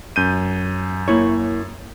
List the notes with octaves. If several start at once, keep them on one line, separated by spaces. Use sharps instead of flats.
F#2 G6 D#7
A#3 E4 C#5